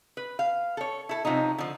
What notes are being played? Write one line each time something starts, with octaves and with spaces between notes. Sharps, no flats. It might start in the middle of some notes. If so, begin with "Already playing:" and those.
B4
F5
A4 C#5
E4 A4
C3 F3 C#4 D#4
D3 F3